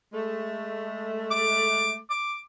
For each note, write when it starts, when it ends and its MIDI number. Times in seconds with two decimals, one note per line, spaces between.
0.13 1.98 56
0.13 1.98 57
1.31 1.93 86
2.10 2.38 86